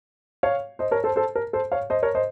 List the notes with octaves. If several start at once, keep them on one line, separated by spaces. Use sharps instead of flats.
C#5 F5
C5 D#5
A#4 C#5
A4 C5
A4 C5
A#4
A4 C5
C#5 F5
C5 D#5
A#4 C#5
C5 D#5